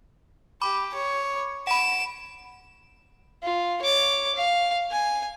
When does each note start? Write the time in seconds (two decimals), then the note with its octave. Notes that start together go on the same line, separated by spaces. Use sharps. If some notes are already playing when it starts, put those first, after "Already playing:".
0.61 G4 B5 D6
0.94 C#5
1.67 F#5 B5 D7 E7
3.43 F4
3.82 C#5 D6
4.35 F5
4.91 G#5